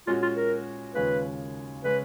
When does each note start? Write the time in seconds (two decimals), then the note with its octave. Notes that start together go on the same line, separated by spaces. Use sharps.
0.07 A#2 G#3 C#4 F4 F#4
0.22 F4
0.36 A#4
0.95 D#2 C#3 G#3 C#4 F4 B4
1.84 C#3 G#3 C#4 B4